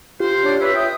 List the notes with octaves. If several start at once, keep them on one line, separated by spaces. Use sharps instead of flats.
F4 G4 C5
D4 C#5
B4 C#5 E5
E5 G5 D#6